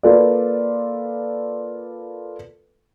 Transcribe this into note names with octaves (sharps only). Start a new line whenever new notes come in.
A#3 F4 A4 B4 D5